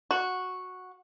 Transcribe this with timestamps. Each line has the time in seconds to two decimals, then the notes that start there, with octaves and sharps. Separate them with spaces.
0.11 F#4